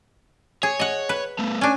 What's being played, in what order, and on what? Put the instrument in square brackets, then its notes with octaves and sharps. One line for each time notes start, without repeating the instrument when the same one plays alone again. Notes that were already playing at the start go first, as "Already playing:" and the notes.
[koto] G#4 [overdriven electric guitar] C#5
[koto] D#5 F#5
B4
[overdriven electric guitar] A3 B3
[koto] C#4 D4 [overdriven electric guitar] G#5